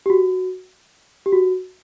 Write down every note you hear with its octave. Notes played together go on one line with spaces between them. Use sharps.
G4
F#4
G4
F#4